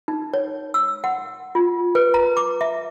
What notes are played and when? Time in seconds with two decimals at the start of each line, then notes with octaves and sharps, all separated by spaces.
0.08 D#4
0.34 C#5
0.74 E6
1.04 F#5
1.55 F4
1.95 B4
2.14 A#5
2.37 D6
2.61 E5